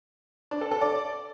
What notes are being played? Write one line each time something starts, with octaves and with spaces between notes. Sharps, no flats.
D4
A4
A4
D5